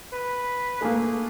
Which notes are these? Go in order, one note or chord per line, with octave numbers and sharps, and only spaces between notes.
B4
A3 A#3 G#4